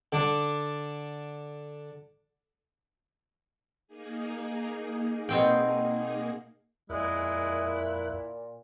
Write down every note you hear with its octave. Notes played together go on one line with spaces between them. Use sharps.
D3 D4
A#3 D#4 G#4
B2 C4 G5
F2 A#2 G#3 E4 A#4 F#6